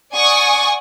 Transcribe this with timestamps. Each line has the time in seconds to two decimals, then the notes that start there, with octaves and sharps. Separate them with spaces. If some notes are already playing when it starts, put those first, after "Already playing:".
0.13 D5 F#5 G#5 C#6 D#6 G#6